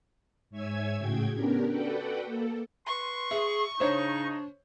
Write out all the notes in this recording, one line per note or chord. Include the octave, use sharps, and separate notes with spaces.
G#2 C#5 E5 G#5 E6 G#6
A2 C#3 F#4 G#4 G5 G#6
B3 C#4 D4 G4 A#4
F#4 A4 B4 D5 F#5 G5
A#3 A4
B4 C6 C#6
G#4 E5
G#2 C#3 D4 D#4 C5 C#5